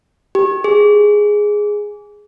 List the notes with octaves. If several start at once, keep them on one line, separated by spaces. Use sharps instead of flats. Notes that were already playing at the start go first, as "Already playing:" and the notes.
G4
G#4